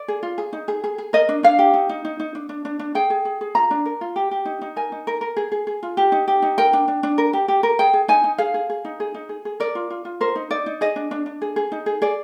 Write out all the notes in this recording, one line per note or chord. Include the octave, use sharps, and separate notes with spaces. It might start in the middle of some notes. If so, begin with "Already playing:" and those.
Already playing: D5
G#4
F4
G#4
D#4
G#4
G#4
G#4
A#4 D#5
D4
D4 F5
G4
D#4
D#4
D#4
D#4
D4
D4
D4
D4
G#4 G5
G#4
G#4
G#4
F4 A#5
D4
A#4
F4
G4
G4
D#4
D#4
A#4 G#5
D#4
A#4
A#4
G#4
G#4
G#4
F4
G4
D#4
G4
D#4
A#4 G5
D4
D4
D4
A#4
G4
G4
A#4
G#4 G5
G#4
D#4 G#5
D#4
G#4 F5
G#4
G#4
D#4
G#4
D#4
G#4
G#4
A#4 D5
F4
F4
F4
A#4 C5
D#4
D#4 D5
D#4
G#4 D#5
D4
D4
D4
G#4
G#4
D#4
G#4
G#4 D5